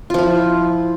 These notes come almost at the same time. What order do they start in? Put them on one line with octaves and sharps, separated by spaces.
F4 F3 E4